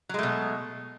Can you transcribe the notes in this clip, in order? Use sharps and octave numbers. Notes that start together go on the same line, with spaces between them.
B2 F#3 G#3 A3